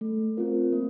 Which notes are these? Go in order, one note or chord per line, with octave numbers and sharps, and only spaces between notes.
A3
C4 F4 A#4
A#3